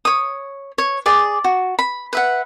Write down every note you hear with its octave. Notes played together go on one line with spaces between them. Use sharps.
C#5 D#6
C#5
G#4 D5 D6
F#4
B5
B4 E5 F#5